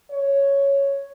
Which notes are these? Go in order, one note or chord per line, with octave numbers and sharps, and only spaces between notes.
C#5